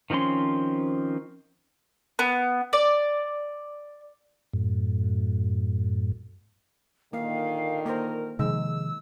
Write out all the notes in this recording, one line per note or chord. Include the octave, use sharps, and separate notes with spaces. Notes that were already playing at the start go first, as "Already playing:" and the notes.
D#3 F3 C4 C#4 C6
B3
D5
F#2 A2
A#2 D3 D#3 A#3 F5
A#3 A#4 C5
C3 D#3 F3 G#3 D#4 E6